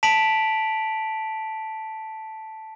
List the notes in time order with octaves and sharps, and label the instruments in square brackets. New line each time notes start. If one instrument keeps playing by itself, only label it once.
[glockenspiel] A5 B6 D7 F7 F#7